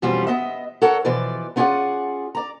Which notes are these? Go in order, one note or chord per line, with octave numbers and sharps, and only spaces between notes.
F2 B2 E3 G3 C#4 F4
B3 D#5 E5
A4 A#4 C#5 F#5
B2 E3 F3 B4 D5
B3 C#4 F4 G#4 D5 F#5
D5 A#5